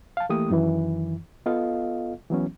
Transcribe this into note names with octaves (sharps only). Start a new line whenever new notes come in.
F5 A5
E3 A3 A#3 G4 D#6
F#2 D#3 E3
B3 F4 A4 D#5 F5
E3 F#3 B3 C#4